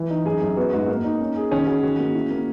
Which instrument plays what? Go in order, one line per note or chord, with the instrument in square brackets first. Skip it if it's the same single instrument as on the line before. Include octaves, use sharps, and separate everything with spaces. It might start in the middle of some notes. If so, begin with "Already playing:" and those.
Already playing: [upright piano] E3
D#4
[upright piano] F#2 [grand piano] G#4
[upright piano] F#2
[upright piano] B3 [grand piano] F#4
[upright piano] G#2 [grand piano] F#4
[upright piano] A#3
D#4
C#4
G#4
[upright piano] D#3 [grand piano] C#4
[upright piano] F#4 [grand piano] G#4
[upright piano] D#3 [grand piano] F#4
[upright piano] A#3
E4
A#3